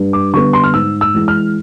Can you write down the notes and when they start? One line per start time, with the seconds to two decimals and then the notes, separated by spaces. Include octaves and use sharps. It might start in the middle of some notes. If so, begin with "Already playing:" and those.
Already playing: G2
0.13 D6
0.33 D3 G3 B3 C#6
0.53 C6
0.64 F6
0.74 G#2 E6
1.01 E6
1.14 E3 G#3
1.28 F6